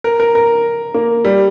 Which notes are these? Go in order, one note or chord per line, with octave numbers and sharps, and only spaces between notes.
A#4
A#4
A#4
A#3
G3